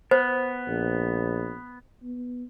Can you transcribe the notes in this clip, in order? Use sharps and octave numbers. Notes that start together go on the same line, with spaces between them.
B3 C5
A#1
B3